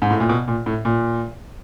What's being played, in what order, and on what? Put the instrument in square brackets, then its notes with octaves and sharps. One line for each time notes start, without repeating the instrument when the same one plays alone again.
[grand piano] G#2
A2
A#2
B2
A#2
A2
A#2